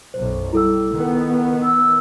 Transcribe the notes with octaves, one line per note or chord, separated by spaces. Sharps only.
B1 F#2 C5
G3 E4 A4 E6
D#3 B3
E6